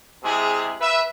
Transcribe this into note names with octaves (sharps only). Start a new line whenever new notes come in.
C3 G#3 E4 G#4
B4 E5